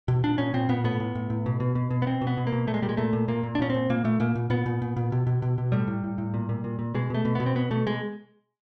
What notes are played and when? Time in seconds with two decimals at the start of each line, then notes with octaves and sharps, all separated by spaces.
0.08 B2
0.24 A#2 D4
0.38 A#2 C#4
0.54 A#2 C4
0.69 A#2 B3
0.84 A2 B3
1.00 A2
1.15 A2
1.30 A2
1.46 B2
1.60 B2
1.75 B2
1.91 B2
2.02 B3
2.07 B2 C4
2.21 B2
2.27 B3
2.37 B2
2.47 A#3
2.52 B2
2.67 A#2 A3
2.74 G#3
2.82 A#2 G3
2.89 G#3
2.97 A#2 A3
3.13 A#2
3.28 A#2 A#3
3.43 A#2
3.55 D4
3.59 A#2 C#4
3.70 A#2 C4
3.90 A#2 A#3
4.04 A#2 A3
4.20 A#2 A#3
4.35 A#2
4.50 A#2 B3
4.66 A#2
4.82 A#2
4.96 A#2
5.12 B2
5.27 B2
5.42 B2
5.58 B2
5.72 A2 G3
5.87 A2
6.04 A2
6.18 A2
6.34 A#2
6.49 A#2
6.64 A#2
6.79 A#2
6.94 B2 G#3
7.10 B2 A3
7.25 B2
7.35 B2 B3
7.46 C4
7.55 B2 B3
7.71 B2 A3
7.86 B2 G#3